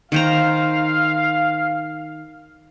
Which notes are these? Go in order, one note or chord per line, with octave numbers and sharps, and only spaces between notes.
D#3 C5 F5 A#5